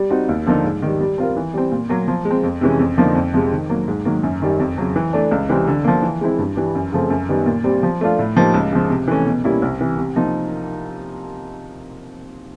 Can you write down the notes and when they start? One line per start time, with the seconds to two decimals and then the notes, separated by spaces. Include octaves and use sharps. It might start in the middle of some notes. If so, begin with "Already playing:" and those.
Already playing: G3
0.10 C4 D#4 F#4
0.29 D#2
0.46 D3 F3 A#3 D#4
0.64 G#2
0.82 D#3 G3
1.00 G3
1.18 C4 F4 A#4
1.37 E3
1.54 G3 C4
1.72 A#2
1.89 F#3 A#3
2.08 F3
2.25 G#3
2.30 C4
2.43 F2
2.61 C3 E3 G#3 C#4
2.79 F2
2.97 D3 F3 A#3 D#4
3.15 F2
3.34 C3 F3 G#3
3.52 D#3
3.69 F#3 A#3
3.88 G#2
4.05 D#3 F#3 A#3
4.23 F#2
4.42 D#3 G3
4.60 F2
4.78 C#3 F#3
4.96 E3
5.13 A3 D4
5.31 C#2
5.49 C3 E3 G3 C4
5.68 D3
5.84 F3 A#3
6.02 E3
6.21 G#3 C4 E4
6.38 G2
6.56 E3 G3
6.75 F#2
6.92 C#3 F3 A3 C4
7.10 F#2
7.29 D#3 G3 B3
7.46 A#2
7.64 G3 C4
7.83 F3
8.01 A3 D4 F4
8.19 A2
8.36 F3 A#3 D#4 G4
8.54 C#2
8.73 C#3 F3
8.90 C3
9.08 E3 A3 C#4
9.26 B2
9.44 G3 A#3 C#4 E4
9.62 C2
9.81 C3 E3
9.98 C3
10.16 F3 A#3 D#4